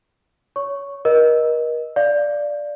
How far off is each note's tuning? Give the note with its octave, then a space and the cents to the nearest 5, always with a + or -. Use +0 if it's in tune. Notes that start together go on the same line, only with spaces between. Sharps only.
C#5 +20 C#6 +0
A#4 +35 D#5 +0
D5 +0 F5 +0